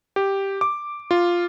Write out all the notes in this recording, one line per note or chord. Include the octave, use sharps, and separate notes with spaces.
G4
D6
F4